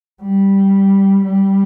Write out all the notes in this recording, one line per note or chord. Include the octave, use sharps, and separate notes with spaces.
G3
G3